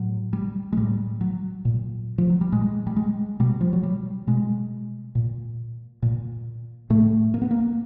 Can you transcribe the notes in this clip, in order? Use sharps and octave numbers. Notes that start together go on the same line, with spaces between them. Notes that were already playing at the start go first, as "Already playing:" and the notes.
Already playing: A2 F#3
G3
G#3
A2 G3
F#3
A#2
F3
F#3
G3
A#2 G#3
G3
G#3
B2 G3
F3
F#3
G3
B2 G#3
A#2
A#2
A2 A3
A#3
B3
A#3